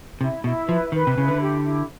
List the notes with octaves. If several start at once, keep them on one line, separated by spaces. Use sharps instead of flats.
C3 E4
B2 E4
F3 B4
D#3 B4
C3
C#3 E4
D3
G4
E4